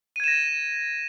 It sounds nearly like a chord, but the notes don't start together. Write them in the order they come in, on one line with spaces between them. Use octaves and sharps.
D#7 G#6 E7 A#6